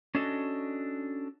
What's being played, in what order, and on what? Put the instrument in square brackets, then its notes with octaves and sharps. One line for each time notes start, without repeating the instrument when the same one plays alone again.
[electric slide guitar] C#4 D4 F#4 A4 D#5